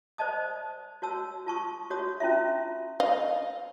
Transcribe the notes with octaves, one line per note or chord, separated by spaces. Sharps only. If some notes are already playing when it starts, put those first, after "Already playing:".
C5 D5 D#5 A5 D#6
F#4 C#5 A5 E6
F4 A5 C#6 D#6
F#4 C#5 D#6
C#4 E4 F4 E5
D#5 F5